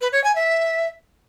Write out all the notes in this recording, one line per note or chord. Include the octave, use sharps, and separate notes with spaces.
B4
C#5
G#5
E5